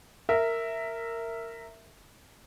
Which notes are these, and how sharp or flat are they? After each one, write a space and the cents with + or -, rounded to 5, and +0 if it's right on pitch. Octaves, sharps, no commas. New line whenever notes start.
A#4 -15 E5 +0